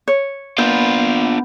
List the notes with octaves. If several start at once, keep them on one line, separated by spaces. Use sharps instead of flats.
C#5
A#3 B3 D4 F4 E6 G6